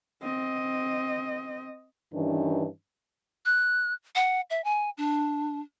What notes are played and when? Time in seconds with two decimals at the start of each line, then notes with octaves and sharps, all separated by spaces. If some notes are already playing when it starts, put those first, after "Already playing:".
0.22 C4 D#5
2.12 G2 D#3 E3 C#4 D4
3.45 F#6
4.15 F#5
4.50 E5
4.64 G#5
4.97 D4